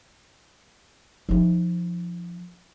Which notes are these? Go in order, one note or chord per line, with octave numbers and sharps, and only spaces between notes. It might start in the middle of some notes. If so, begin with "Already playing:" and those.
F3 D#4